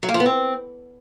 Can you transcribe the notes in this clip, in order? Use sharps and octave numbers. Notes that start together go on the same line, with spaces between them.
F#3
A#3
F3
B3
C4